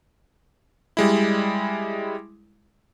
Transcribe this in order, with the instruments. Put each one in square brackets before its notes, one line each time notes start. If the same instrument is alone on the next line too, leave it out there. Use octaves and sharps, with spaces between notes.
[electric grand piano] G3 G#3 E4